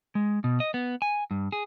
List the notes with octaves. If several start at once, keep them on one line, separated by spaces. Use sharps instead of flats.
G#3
B2
D#5
B3
G#5
G2
G#4